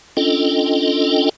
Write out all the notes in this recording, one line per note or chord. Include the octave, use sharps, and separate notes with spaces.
C#4 D4 F4 A4 D#5 G5